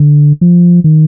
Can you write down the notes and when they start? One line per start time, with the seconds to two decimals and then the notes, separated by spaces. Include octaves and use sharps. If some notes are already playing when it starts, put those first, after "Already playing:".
Already playing: D3
0.41 F3
0.84 D#3